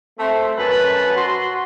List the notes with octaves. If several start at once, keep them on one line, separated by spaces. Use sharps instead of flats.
A3 C4
F#2 B4 A5
F#4 C6